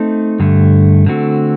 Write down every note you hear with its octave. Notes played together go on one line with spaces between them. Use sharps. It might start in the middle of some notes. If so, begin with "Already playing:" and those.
Already playing: A3 C4 D#4
G2 D3 A3
D3 A3 C4 F#4